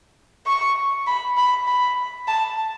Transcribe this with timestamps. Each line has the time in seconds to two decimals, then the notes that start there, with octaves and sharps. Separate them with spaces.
0.47 C#6
1.07 B5
1.37 B5
1.67 B5
2.28 A5